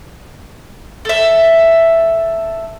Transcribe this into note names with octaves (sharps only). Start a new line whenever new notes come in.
A4 E5